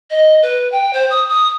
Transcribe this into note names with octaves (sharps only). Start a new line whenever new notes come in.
D#5
B4
G5
C5
D#6
D#6